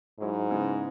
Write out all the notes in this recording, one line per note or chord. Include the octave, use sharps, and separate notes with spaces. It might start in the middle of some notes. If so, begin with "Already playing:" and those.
G#2 F#3 E4
C#3 G#3 B3 E4